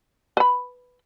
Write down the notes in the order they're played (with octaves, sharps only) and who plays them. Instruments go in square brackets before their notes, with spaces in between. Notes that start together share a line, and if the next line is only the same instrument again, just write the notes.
[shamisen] B4 B5